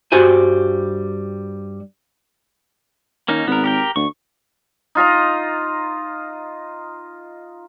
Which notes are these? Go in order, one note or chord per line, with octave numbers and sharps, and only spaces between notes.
G2 G3 F#4 C5 G#5
D#3 A#3 C#4 D#4
G#1 B3 A#4
G4 A#4 G5
D2 C#6
D#4 F4 D#5 A#5